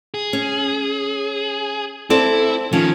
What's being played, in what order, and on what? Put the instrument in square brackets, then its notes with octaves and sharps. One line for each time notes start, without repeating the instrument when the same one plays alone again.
[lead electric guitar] G#4
[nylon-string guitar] C#4
[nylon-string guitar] C4 A4 D5 [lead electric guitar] E4
[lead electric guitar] D#3 [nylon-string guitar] F3 C#4